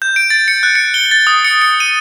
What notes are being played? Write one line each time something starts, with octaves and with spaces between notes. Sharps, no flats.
G6
D7
A6
C#7
F#6
C#7
G7
A6
D#6
C#7
C#7
D#7